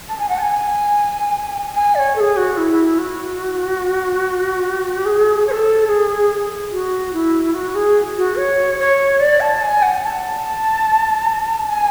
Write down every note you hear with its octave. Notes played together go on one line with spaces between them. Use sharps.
A5
G#5
F#5
A5
G#5
G#5
D5
C#5
A4
G#4
F#4
E4
F#4
G#4
C#5
A4
G#4
F#4
E4
F#4
G#4
F#4
C#5
C#5
D5
A5
G#5
F#5
A5
G#5